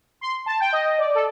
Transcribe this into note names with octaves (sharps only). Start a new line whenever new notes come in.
C6
A5
G5
D#5
D5
A4